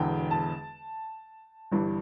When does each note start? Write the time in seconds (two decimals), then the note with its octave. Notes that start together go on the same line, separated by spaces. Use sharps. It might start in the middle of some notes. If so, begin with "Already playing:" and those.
Already playing: E1 E2 D3 G5
0.31 A5
1.72 G1 G2 E3